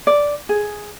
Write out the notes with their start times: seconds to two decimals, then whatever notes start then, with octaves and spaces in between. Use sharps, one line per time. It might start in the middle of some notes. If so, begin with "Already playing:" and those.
0.07 D5
0.49 G#4